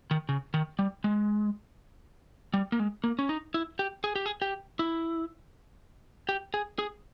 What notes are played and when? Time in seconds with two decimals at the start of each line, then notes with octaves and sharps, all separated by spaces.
0.11 D#3
0.29 C#3
0.54 D#3
0.79 G3
1.04 G#3
2.54 G3
2.72 A#3
2.79 G#3
3.04 A#3
3.19 C#4
3.29 D#4
3.54 E4
3.79 G4
4.04 G#4
4.16 G4
4.26 G#4
4.42 G4
4.79 E4
6.29 G4
6.54 G#4
6.79 G#4